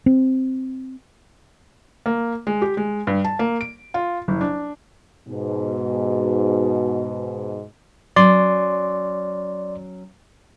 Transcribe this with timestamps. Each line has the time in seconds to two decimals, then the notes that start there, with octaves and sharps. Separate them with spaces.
0.06 C4
2.06 A#3
2.47 G#3
2.62 G4
2.77 G#3
3.07 G2
3.25 A5
3.39 A#3
3.61 D7
3.94 F4
4.28 F#1
4.41 D4
5.28 G#2 B2
8.16 F#3 C#4 D5 C6